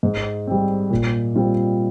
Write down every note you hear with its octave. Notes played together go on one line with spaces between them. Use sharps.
G#2
G3 C4
A#2
G3 C4 F4